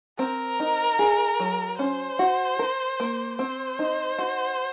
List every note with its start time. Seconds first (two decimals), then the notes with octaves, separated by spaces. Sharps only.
0.19 C4 A#4
0.60 D#4
0.99 G#4
1.40 F#3
1.79 C#4 C5
2.19 F#4
2.59 A#4
3.00 A#3
3.39 C4 C5
3.79 D#4
4.19 F#4